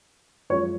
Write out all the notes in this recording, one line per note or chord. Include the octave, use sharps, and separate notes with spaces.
F#2 F3 G#3 C#5